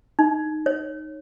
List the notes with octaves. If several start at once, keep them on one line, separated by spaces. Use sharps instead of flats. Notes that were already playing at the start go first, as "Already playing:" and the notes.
D#4
C#5